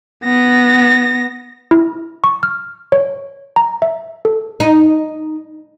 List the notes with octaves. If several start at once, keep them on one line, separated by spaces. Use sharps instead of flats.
B3 A#6
E4
C#6
F6
C#5
A#5
E5
A4
D#4